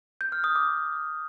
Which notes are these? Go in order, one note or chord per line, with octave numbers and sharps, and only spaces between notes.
G6
F6
D#6
D6